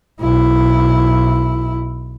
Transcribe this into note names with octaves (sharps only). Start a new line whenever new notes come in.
B1 E4